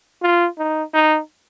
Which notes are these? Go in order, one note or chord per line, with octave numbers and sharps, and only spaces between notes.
F4
D#4
D#4